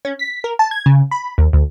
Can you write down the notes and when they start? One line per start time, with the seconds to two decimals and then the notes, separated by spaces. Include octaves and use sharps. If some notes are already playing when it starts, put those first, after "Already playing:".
0.05 C#4
0.19 B6
0.44 A#4
0.59 A5
0.71 G#6
0.86 C#3
1.11 B5
1.38 D#2
1.53 D2